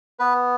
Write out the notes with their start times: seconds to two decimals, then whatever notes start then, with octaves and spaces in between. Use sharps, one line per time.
0.19 B3 B4